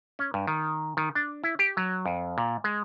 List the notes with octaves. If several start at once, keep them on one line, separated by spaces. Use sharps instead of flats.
C#4
G2
D#3
D#3
D4
E4
G4
F#3
F2
A#2
G#3